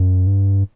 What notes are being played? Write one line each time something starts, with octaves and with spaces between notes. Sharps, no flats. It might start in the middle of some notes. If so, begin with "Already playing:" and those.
Already playing: F#2
G2